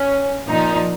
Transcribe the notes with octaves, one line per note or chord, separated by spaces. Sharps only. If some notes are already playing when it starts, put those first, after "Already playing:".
Already playing: C#4
A#2 F3 D#4